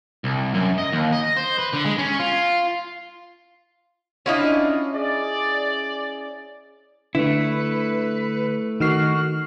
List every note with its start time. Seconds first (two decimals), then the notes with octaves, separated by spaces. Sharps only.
0.24 C2
0.54 F#2
0.78 D#5
0.92 D#2
1.13 D#5
1.37 C5
1.59 B4
1.73 D3
1.85 G#3
1.98 C#4
2.20 F4
4.26 C#4 D4 E4 F4 D#5 F5
4.92 G#4 D5
7.15 D3 A3 E4 B4
8.80 D#3 F#4 F6 C7